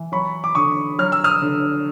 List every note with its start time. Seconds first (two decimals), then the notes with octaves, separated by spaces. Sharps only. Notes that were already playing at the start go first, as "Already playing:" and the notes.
Already playing: E3
0.12 F#3 B5 C#6
0.44 D6
0.55 D3 C#6 D#6
0.99 F#3 F6
1.12 E6
1.24 D#6 F6
1.42 D3